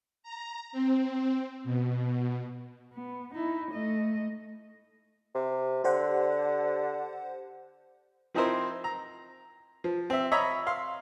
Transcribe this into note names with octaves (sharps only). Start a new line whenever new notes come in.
A#5
C4
B2
B3
D#4 E4
A3 D#5
C3
D3 G4 C5 F#5
F3 C4 D#4 E4 A#4 C5
A#5
F3
C4 E5
C#5 D#5 E5 A#5 B5
F5 C6